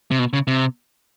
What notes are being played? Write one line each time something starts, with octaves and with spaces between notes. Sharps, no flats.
C3
B2
C#3
C3